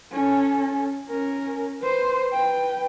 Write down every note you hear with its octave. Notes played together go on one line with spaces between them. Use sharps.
C#4 A4
C#4 A#4
B4 C5
B4 G5